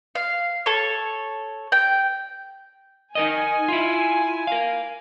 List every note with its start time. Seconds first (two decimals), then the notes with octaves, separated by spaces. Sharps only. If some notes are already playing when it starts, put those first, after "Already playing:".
0.15 F5
0.66 A4 C#5
1.72 G5
3.15 D#4 A#4 D#5 G#5
3.68 E4 F4
4.47 A#4 F5